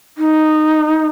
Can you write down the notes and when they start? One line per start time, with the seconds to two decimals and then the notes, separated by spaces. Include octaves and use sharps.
0.18 D#4